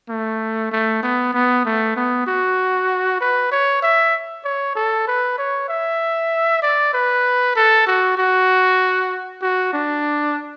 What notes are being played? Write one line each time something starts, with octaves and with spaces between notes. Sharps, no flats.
A3
A3
B3
B3
A3
B3
F#4
B4
C#5
E5
C#5
A4
B4
C#5
E5
D5
B4
A4
F#4
F#4
F#4
D4